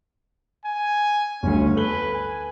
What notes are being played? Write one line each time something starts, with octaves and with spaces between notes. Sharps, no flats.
G#5
G1 D2 C#4
A4 B4 F#7 G7
G#5